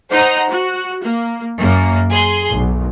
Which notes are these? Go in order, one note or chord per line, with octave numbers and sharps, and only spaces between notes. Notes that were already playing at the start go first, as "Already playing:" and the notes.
D#4 C5 F#5 A#5
F#4
A#3
F#2 A#3
G#4 C6
B1